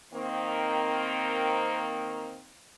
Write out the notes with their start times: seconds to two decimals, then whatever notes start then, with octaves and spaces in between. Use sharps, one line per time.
0.14 D#3 A#3 C4